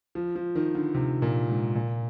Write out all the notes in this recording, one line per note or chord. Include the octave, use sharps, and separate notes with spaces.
F3
F3
D#3
D3
C3
A#2
G#2
A#2